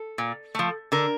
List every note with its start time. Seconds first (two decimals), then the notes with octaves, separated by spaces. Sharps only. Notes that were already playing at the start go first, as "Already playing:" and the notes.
Already playing: A4
0.18 A#2
0.55 F3 A3
0.92 D3 A#4